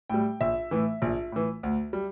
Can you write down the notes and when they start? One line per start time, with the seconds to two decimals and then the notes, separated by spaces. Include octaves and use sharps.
0.10 A2 G3 G5
0.41 A#1 E5
0.71 A2 E3
1.02 A#1
1.32 A2 E3
1.63 D2
1.93 G3